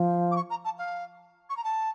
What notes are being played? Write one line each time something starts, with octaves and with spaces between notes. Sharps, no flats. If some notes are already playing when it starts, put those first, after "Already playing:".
Already playing: F3
D6
C#6
A#5
A5
F5
C#6
A#5
A5